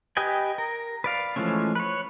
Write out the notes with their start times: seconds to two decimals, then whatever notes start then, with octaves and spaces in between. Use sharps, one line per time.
0.17 G4 B4 D#5 G5 G#5
0.58 A#4
1.04 B4 D5 F5
1.36 E3 F3 G#3 A3 C#4
1.75 B4 C#5